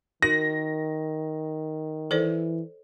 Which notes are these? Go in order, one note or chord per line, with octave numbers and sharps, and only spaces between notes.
D#3 D#4 F#4 A#4 A#6
E3 A4 C5 D5